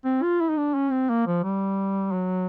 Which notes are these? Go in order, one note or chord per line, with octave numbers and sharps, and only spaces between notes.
C4
F4
E4
D#4
D4
C#4
C4
A#3
F3
G3
F#3